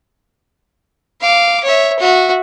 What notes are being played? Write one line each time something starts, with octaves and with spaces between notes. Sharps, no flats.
F5 D6
C#5 E5
F#4 E5